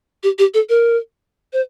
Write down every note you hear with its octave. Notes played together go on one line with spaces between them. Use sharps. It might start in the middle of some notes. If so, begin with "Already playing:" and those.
G4
G4
A4
A#4
C5